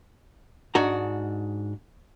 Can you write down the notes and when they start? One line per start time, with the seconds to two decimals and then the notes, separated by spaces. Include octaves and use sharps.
0.75 G#2 D4 F#4 A#5